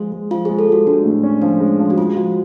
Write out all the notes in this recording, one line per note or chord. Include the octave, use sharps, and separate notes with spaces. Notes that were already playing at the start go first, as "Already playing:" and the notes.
Already playing: F3 G#3
G#3
F3 F4
G#3 G#4
A4
G#3 F#4
G#3 D4
A2
C#4
F3 D4
G#3
F3
F#4
G#3 F4
F3 F#4